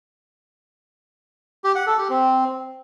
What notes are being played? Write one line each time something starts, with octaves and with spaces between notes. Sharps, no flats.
G4
F#5
A4
G4
C4